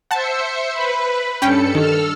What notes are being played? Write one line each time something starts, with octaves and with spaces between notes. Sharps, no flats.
C5 E5 F#5 A5 C#7
B4 B5
G2 C#4 A4 G5 C#7
D#3 A4 E6 F6